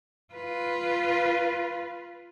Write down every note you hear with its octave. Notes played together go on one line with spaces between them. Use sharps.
F4 B4